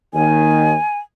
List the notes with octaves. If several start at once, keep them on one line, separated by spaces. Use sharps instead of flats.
D#2 D#3 G#5